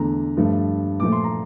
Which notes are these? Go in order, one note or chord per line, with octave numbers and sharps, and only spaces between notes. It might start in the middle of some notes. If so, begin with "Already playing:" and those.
Already playing: E2 D3 A3 A#5
G2 F3 A3
A#2 F3 A3 D6
C6
A#5